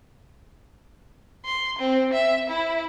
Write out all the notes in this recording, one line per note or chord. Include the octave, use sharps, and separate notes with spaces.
C6
C4
E5
E4